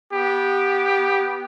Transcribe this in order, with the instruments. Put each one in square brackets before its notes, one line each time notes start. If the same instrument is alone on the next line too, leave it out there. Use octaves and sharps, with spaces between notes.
[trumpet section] B3 G4